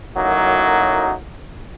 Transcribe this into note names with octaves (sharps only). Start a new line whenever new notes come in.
F#2 A2 F#3 A#3 D#4